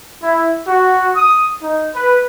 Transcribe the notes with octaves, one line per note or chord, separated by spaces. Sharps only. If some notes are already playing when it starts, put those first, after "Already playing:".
E4
F#4
D#6
D#4
B4